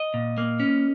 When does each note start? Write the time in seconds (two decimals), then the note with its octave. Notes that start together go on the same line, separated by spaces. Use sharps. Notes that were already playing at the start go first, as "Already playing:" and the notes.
Already playing: D#5
0.14 A#2
0.38 A#3
0.60 C#4